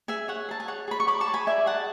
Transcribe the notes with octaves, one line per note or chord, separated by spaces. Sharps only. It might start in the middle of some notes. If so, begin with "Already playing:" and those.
G#4 E5 G#5
C#5 F#5
G#4 A5
G#5
C#5 F#5
G#4 B5
C#6
C#5 B5 D6
A5 C#6
G#4
G#5 B5
D5 E5 G#5
G#4 F#5 A5